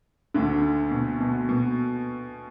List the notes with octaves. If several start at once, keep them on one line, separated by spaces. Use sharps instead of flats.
D2 D3
B2
B2
B2